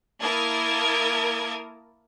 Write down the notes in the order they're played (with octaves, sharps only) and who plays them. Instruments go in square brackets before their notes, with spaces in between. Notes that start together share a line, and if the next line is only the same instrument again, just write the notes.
[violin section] A#3 E4 A#4 A5 D#6 G#6